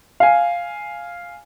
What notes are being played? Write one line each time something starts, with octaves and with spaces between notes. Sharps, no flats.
F5 G#5